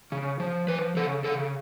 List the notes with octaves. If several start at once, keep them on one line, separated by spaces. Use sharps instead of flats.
C#3
F3
F3 B4
C#3 A4
C#3 A4